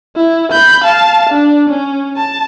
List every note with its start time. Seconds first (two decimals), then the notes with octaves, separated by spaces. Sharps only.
0.16 E4
0.52 B5 G6
0.84 F5 A5
1.30 D4
1.69 C#4
2.16 A5